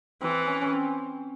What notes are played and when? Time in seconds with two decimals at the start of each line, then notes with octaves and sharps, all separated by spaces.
0.21 E3 C4
0.47 C#4
0.61 C#4
0.73 C4